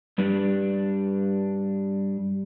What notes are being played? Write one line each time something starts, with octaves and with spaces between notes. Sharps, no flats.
G2 G3 D4